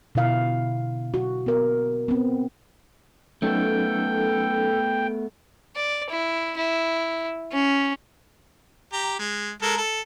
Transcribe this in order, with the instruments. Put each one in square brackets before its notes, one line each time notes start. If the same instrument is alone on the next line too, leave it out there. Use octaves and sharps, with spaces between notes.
[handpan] B2 D3 E4 F5
F#4
B3 A#4
B3 C4
[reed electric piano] F#3 C#4 D#4 [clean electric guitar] A3 B3 [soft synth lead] A4 [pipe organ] G5
[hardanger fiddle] D5
E4
E4
C#4
[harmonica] G4 A#5
G#3
G#3 A4 A#4
A4